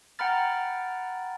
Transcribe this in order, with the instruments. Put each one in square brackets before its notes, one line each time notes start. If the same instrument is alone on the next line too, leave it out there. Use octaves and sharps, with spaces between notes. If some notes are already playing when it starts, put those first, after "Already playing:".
[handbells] F#5 G5 A#5 B5 F6 A6